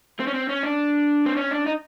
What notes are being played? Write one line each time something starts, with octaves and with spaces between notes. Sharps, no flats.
C4
C#4
C4
C#4
D4
C4
C#4
D4
D#4